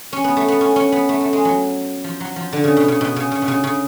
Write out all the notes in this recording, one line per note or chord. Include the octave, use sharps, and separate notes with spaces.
C#4
B3
A3
B3
C#4
C#4
B3
A3
A3
G#3
F#3
F3
F#3
F3
D3
C#3
B2
C#3
B2
C#3
C#3
B2
C#3
C#3